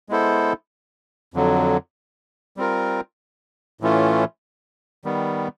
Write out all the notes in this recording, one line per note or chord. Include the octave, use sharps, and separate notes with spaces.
G#3 B3 E4 A4 C5
F2 D3 F#3
G3 C4 F4 A#4
A2 E3 A3 C#4 F4
D#3 G3 B3